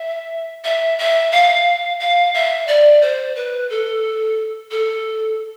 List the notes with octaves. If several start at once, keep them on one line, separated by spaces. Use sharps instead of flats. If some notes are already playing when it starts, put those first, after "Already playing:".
Already playing: E5
E5
E5
F5
F5
E5
D5
C5
B4
A4
A4